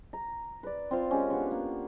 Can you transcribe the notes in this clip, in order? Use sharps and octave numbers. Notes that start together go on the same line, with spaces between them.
A#5
B4 D5
C4 F4 F5
G#3 C#4 G4 A#4
B3 D4 G4 C#6
A#3